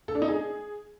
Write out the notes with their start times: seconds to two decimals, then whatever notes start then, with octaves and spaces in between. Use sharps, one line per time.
0.08 A4
0.15 D4
0.22 D#4
0.29 G#4